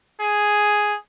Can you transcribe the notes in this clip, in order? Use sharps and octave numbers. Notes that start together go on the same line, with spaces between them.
G#4